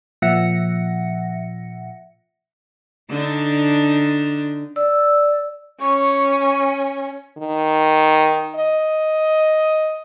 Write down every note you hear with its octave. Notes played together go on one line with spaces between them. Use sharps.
A#2 F3 E5 F#5 A#6 C#7
D3 D4 D#4
D5 E6
C#4 C#6
D#3
D#5